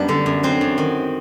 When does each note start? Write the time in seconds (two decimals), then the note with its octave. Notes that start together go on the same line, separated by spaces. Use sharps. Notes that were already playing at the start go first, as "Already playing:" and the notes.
Already playing: F#2 G3 B3 D4
0.09 D3
0.26 F#2
0.43 F#3 C4
0.61 F#2
0.78 D#3